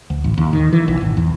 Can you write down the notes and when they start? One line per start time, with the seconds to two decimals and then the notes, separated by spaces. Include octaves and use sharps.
0.10 D2
0.24 A1
0.38 D#2
0.53 D#3
0.73 E3
0.88 B1
1.01 G#1
1.17 E2